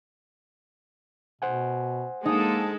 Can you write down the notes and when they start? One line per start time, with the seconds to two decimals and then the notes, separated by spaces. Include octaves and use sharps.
1.42 B2 C5 F#5 G#5
2.25 G#3 A#3 D#4 A4